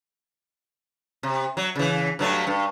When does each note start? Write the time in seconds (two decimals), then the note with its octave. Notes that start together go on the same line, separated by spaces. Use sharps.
1.23 C3
1.57 F#3
1.76 C#3 E3
2.19 G2 F#3 A3
2.47 G2